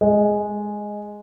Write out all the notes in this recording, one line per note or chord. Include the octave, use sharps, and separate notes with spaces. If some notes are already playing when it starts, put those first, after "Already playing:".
G#3